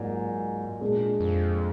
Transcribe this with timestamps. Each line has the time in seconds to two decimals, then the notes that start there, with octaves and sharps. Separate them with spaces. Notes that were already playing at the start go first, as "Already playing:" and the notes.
Already playing: G#2 F#3 A#3 F4 D5
0.81 A#2 G#3 D4 F4 G#4
1.20 F2